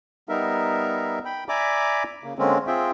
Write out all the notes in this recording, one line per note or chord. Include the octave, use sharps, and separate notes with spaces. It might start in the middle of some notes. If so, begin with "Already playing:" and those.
G3 B3 D#4 A#4 E5
G5 B5
D5 E5 G#5 A#5 B5 D6
C#3 A#3
D3 G#3 A#3 C4 C#4
C4 F4 G#4 E5 G5